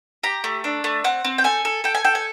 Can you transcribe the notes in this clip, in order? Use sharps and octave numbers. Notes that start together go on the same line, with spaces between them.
G4 A#5
A3
D4
A3
C4 F#5
C4
G5
A4 G#5
A4
A4 G5
G#5
A4 G5
G#5